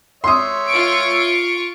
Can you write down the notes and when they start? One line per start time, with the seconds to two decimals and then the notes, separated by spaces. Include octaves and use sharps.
0.24 C#5 E5 C6 D#6
0.68 F4 C#6 D7